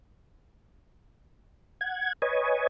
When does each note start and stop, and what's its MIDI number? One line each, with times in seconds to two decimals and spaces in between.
1.81 2.13 78
1.81 2.13 92
2.22 2.67 71
2.22 2.67 73
2.22 2.67 75
2.22 2.67 80